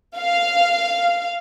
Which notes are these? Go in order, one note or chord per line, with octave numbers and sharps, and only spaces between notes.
F5